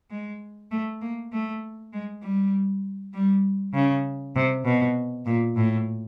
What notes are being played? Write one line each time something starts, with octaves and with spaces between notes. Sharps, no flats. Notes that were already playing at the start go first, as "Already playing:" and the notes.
G#3
A3
A#3
A3
G#3
G3
G3
C#3
C3
B2
A#2
A2